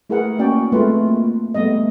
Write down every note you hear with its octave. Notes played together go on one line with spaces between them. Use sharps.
A3 E4 G#4 A#4 B4 F#5
A#3 C#4 F#4 D5 G5
G#3 A3 C4 F4 B4
A#3
G3 A3 B3 D#5